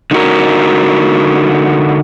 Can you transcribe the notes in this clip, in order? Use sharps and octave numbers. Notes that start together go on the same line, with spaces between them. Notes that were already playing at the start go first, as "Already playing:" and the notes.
D3 D#4 F#4 A#4